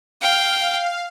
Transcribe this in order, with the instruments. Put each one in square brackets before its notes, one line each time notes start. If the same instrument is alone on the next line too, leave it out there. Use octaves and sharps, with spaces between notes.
[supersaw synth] F5 [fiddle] G5